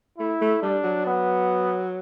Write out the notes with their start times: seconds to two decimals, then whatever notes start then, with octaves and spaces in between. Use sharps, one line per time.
0.19 A3 E4
0.41 A3
0.62 G3 D4
0.83 F#3
1.06 B3